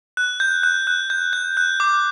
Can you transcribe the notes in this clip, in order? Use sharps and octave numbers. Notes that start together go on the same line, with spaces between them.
F#6
G6
F#6
F#6
G6
G6
F#6
D6